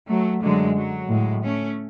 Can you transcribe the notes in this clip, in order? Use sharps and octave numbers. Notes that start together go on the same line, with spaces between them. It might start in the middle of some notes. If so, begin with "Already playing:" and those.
F#3 A3
F#2 D3 F#3 G#3
F#3
A2 F#3 G#3
A3 C#4